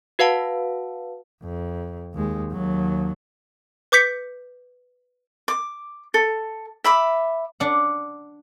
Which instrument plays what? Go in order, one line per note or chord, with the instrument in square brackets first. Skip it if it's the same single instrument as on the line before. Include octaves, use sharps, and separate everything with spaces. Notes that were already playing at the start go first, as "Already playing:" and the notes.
[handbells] F#4 B4 F5 F#5 A5
[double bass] F2
D#2 G#3
D#2 F#3
[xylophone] B4 D6 G6 B6 C#7
[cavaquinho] D6
A4
E5 B5 D6
[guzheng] D4 F#5